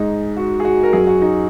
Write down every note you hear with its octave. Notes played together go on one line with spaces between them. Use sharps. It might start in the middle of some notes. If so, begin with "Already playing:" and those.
Already playing: G#2 G#3 D#4
F#4
G#4
F#4
A#4
F#2 F#3 G#4
F#4
D#4